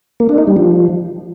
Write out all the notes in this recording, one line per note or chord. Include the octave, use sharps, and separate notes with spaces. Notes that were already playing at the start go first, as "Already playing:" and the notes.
A#3
D4
D#4
G3
F3